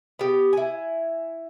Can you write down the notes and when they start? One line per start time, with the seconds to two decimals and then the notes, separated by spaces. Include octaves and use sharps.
0.19 B3 G4
0.53 E4 G#5